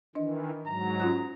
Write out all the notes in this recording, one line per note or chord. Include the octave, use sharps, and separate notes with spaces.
D#3 E3 D4 D#5
G#2 F#3 A#5
C#4 F4 F#6